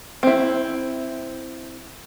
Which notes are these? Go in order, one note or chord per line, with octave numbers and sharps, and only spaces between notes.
C4 E4